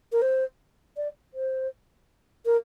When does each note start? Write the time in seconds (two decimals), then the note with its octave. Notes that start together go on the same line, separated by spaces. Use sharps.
0.12 A#4
0.21 C5
0.96 D5
1.34 C5
2.45 A#4